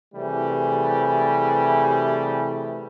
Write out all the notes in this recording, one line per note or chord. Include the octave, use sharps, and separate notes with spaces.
C3 E3 G3 A3 G#4